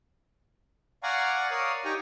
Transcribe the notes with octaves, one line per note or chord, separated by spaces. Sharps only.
D5 F5 F#5 G#5 A#5 C#6
A#4 C#5 D5 F5 D#6
D#4 G4 G5 G#5 A#5 C#6